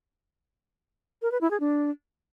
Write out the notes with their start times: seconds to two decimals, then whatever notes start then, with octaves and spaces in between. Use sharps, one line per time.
1.22 A#4
1.31 B4
1.41 E4
1.51 G#4
1.60 D4